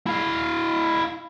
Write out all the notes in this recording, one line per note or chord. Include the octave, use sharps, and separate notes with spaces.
E4 F5